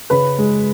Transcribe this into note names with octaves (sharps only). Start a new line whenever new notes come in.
C#3 B4 B5
G#3